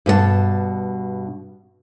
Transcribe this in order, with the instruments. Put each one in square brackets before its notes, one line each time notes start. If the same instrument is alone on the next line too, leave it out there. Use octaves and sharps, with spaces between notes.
[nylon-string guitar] G2 B2 G#4 A5